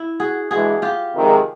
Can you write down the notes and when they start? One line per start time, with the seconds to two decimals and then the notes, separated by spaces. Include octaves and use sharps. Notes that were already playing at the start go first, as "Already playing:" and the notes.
Already playing: E4
0.20 F#4 G#4
0.51 G2 E3 G#3 F#4 G#4
0.82 F4 G4
1.14 F2 C3 D#3 G#3